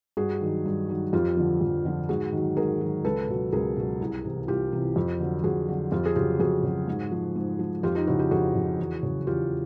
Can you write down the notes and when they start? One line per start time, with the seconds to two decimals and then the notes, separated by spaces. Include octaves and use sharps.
0.17 G2 F#4 G#4
0.41 D#3 F#3
0.65 G2
0.89 D#3 F#3
1.13 F2 F4 G4
1.37 D3 F3
1.61 F2
1.85 D3 F3
2.09 G#2 F#4 G#4
2.32 D#3 F#3
2.57 G#2 G#4 A#4
2.81 D#3 F#3
3.04 C#2 A4 B4
3.29 B2 F#3
3.52 C#2 G#4 A#4
3.76 B2 F#3
4.00 C2
4.24 C3 E3
4.48 C2 F4 G4
4.72 C3 E3
4.96 F2
5.20 D3 F#3
5.44 F2 F#4 G#4
5.68 D3 F#3
5.92 F2 F4 G4
6.05 G#4
6.16 C#3 F#3 F4 G4
6.40 F2 F#4 G#4
6.63 C#3 F#3
6.88 G#2
7.12 F3
7.36 G#2
7.59 F3
7.83 F2 F4 G4
7.95 D#4 F4
8.07 C#3 F3 E4 F#4
8.19 F4 G4
8.31 F2 F#4 G#4
8.55 C#3 F3
8.79 E2
9.03 C#3 F#3
9.27 E2 F4 G4